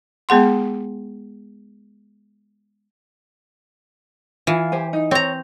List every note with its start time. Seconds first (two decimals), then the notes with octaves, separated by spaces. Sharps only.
0.29 G#3 B3 G#4 F#5 C6
4.47 E3 F4 F5 G#5
4.72 G4 C5 G#5
4.93 D#4
5.11 C4 C#5 A#5